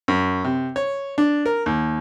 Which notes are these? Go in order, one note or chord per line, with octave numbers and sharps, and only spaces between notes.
F#2
C3
C#5
D4
A#4
D#2